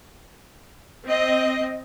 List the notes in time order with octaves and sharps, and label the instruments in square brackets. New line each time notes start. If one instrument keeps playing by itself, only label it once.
[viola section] C4 D#5